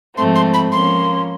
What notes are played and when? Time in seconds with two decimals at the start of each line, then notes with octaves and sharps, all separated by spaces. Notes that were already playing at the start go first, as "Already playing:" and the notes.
0.16 G#2 F3 A3 C4 C6
0.35 C6
0.54 B5
0.72 F3 A#3 C#4 C6